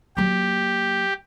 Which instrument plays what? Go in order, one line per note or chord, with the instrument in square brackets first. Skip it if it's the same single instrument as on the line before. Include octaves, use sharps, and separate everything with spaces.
[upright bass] F#3 A#3 [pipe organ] G4